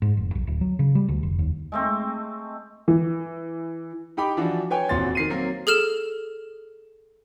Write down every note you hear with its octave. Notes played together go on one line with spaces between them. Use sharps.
G#2
F1
B1
D1
F#3
C#3
G3
D2
F1
D#2
G#3 A3 C4
E3
D#4 G4 G5 B5 D6
E3 F3 D4 F#4
B4 C#5 G5 G#5
D#1 E2 C4 F#4 C6 A6
D#3 C7 D#7
F#3 A#3 C4 A#4
G#4 A4 F6 E7